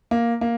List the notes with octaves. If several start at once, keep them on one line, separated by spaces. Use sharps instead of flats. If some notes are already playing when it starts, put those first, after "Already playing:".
A#3
A#3